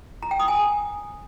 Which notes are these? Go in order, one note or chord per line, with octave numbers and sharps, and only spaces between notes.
A#5
G5
D#6
G#5